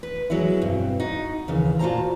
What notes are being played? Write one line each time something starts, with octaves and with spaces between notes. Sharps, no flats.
B4
F#3 G#3 B3 E4
G2 B2 C4
D#4 F#4
D#2 C#3 E3
A#2 F4 F#4 C5 A5 A#5